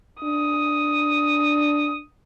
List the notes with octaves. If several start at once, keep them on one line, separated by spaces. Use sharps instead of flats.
D4 D#6